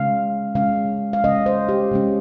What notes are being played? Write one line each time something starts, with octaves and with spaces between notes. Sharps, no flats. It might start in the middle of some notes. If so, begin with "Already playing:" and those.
Already playing: C#3 G#3 C#4 F5
C#3 G#3 C#4 F5
F5
C#3 G#3 C#4 D#5
C5
G4
C#3 G#3 C#4